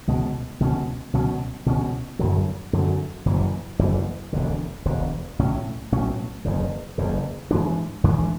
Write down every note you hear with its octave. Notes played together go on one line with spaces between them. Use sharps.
C#2 B2 G#3 C#4
C#2 B2 G#3 C#4
C#2 B2 F#3 C#4
C#2 B2 F#3 C#4
F#2 D3 F#3
F#2 D3 F#3
F#1 F#2 E3
F#1 F#2 E3
E1 D2 D3
E1 D2 D3
B1 A2 F#3 C#4
B1 A2 F#3 C#4
F#1 E2 C#3
F#1 E2 C#3
G#2 E3 G#3 D4
G#2 E3 G#3 D4